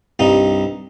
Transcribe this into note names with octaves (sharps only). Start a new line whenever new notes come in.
C2 G2 D#4